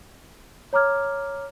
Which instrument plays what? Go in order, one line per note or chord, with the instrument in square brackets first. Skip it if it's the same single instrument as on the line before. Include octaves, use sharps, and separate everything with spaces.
[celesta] C#5 A#5 D6 F6 G#6